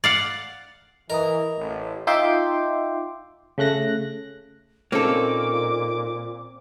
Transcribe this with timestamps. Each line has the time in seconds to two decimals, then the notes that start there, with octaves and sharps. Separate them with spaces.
0.04 D5 F5 F#5
1.10 E3 A#4 D#5 A#5 D#6
1.57 A1 A2
2.07 D#4 F4 E5 G5 C6 D6
3.58 C#3 A3 F#6 A#6
4.92 A#2 A#3 C4 C#4 D#4 A4 D6